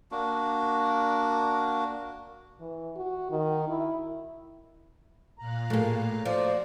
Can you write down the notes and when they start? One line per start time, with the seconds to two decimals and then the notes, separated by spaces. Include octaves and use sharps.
0.11 A#3 D4 F#4
2.60 E3
2.96 F#4
3.31 D#3
3.68 E4
5.39 A#2 F5 A#5 F#6
5.70 A2 A3 A#3 G#4
6.25 F3 F#4 C5 D5